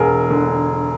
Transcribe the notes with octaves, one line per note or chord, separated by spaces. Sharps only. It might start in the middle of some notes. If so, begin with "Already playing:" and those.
Already playing: E1 G#4 A#4
D3